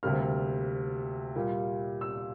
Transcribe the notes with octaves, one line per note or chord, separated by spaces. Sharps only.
D2 C3 G3 A#3 F6
A#2 G3 A#3
E6